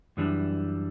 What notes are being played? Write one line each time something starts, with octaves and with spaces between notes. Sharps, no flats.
F#2 E3 G3 D4